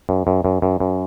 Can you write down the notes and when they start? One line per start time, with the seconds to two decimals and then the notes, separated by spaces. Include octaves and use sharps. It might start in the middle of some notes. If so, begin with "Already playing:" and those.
0.09 F#2
0.27 F#2
0.45 F#2
0.62 F#2
0.80 F#2